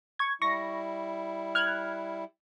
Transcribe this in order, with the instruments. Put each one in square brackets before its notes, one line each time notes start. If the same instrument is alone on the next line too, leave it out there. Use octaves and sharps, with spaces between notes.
[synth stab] C#6 G#6
[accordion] G3 E4 [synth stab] C#6 A#6
[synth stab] F6 F#6 G#6